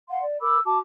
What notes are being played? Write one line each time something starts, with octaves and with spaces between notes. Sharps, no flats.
F5 F#5 C6
D5
A#4 B5 D6 E6
F#4 A5 D6